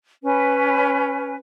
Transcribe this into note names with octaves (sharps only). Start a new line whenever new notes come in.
C#4 B4